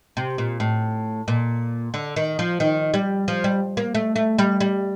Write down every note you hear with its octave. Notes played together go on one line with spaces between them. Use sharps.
C3
A#2
A2
A#2
D3
D#3
F3
D#3
G3
F3
G3
A#3
A3
A3
G3
G3